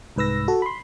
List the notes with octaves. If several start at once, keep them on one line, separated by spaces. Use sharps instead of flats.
C2 G#2 B4 E6 A#6
F#4 A4
B5 C6